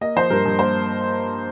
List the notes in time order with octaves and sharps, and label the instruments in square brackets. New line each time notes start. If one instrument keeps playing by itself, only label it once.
[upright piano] A#3 D#5
F3 C5
G2 A#4
G2
A#3 C5